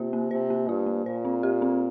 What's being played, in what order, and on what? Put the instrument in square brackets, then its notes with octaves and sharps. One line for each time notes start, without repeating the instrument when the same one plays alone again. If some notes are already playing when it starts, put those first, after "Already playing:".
Already playing: [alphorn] C3 [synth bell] A#3 F4
[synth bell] A#3
[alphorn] C3 [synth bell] C5
[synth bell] A#3
[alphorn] G2 [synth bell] F4
[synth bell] A#3
[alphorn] A#2 [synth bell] C5
[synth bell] C4
G4
C4